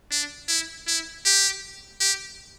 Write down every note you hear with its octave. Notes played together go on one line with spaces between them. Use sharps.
D4
E4
E4
G4
G4